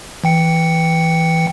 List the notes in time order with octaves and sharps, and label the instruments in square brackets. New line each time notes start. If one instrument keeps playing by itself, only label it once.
[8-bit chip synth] E3 G5 C#7